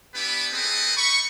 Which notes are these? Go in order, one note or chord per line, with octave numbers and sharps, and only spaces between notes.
B3 D4 E4 G4 B4
C4 G#4 A4 B4 D#5
B5 C#6